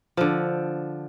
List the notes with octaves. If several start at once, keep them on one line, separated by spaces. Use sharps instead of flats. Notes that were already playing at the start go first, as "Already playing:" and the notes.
D3 F3